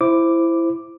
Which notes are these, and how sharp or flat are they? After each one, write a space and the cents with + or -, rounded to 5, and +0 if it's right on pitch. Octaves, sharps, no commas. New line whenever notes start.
E4 +15 C5 +0 D6 +0